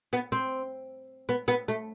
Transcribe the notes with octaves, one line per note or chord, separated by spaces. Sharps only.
B3
C4
B3
B3
A3